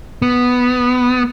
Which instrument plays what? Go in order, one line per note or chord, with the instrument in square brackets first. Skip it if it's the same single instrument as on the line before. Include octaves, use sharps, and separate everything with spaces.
[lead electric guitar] B3